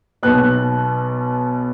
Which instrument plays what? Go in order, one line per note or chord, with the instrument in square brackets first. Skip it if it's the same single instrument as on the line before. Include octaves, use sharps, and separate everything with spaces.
[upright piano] B1 B2 B3 F#6